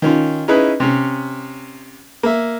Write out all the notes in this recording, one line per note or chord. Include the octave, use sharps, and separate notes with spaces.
D#3 C#4 F4
C#4 D#4 E4 G#4 B4
C3 C#4
A#3 E5